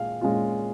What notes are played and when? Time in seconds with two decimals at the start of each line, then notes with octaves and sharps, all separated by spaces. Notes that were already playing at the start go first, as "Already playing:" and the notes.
Already playing: A#2 G#3 F5
0.21 A#2 G#3 C#4 F4